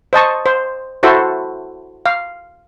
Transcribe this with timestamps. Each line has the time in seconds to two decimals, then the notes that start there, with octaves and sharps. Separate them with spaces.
0.13 C5 D#5 A5 C#6
0.46 C5
1.03 E4 F#4 A4 C5 E5
2.06 F5